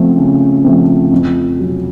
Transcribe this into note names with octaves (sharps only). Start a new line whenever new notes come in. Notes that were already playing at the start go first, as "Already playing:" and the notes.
Already playing: C#3 F3 A3 C4
C#3
F3 A3 C4
F2
F#3
C3